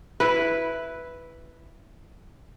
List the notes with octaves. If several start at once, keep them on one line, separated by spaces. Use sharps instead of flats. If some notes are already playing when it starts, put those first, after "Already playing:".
E4 B4